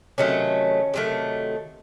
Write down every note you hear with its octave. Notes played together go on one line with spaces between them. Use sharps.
C3 D#3 F#3 A3 C#4
C3 D#3 F#3 A3